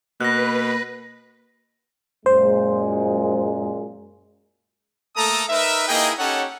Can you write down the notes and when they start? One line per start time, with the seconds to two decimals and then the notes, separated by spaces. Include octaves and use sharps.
0.21 B2 A#3 B4 F#6 A#6
2.26 F#2 A#2 G#3 C5
5.17 A3 A#3 A4 A5 A#5 D#6
5.49 D#4 A#4 B4 E5
5.88 A#3 D#4 E4 G#4 D#5 G5
6.19 C#4 D#4 G4 A4 C#5 F#5